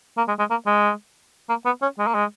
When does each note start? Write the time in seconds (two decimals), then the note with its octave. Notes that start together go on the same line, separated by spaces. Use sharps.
0.17 A#3
0.28 G#3
0.39 G#3
0.50 A#3
0.66 G#3
1.49 A#3
1.65 B3
1.82 C#4
1.98 G#3
2.07 A#3
2.15 G#3